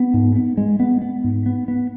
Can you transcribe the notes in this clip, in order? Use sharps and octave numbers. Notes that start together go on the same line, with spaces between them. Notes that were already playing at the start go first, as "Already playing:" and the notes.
Already playing: B3
G#2
B3
G#3
B3
B3
G#2
B3
B3